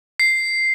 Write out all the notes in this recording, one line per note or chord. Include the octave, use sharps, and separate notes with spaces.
C7